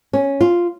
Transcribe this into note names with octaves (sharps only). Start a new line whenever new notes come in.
C#4
F4